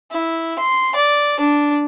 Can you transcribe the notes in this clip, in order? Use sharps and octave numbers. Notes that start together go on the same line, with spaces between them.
E4
C6
D5
D4